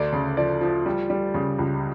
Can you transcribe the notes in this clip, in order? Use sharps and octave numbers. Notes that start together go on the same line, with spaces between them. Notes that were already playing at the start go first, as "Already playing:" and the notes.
Already playing: D2 D5
C#3
F3 D5
F3
G3
G3
C#3
C#2